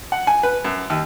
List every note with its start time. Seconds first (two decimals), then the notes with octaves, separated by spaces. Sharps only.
0.12 F#5
0.27 G#5
0.43 B4
0.65 F#2
0.90 D#2